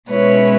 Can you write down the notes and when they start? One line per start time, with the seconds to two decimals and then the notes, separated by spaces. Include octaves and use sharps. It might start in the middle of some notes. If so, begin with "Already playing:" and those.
0.10 B2 G#3 C#4 E4 B4 C#5